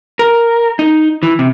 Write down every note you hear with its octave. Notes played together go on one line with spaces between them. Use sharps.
A#4
D#4
E3
C3